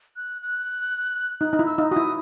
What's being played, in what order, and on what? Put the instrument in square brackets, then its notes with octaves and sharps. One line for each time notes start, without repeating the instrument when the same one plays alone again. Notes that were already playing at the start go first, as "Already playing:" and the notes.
[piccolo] F#6
F#6
[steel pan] D#4 [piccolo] F#6
[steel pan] D#4
E4
[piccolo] E6
[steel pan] D#4
[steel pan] F#4 [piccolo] D#6
[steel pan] E4